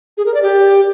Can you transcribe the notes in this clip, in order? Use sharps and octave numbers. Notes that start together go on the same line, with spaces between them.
G#4
A#4
D5
G4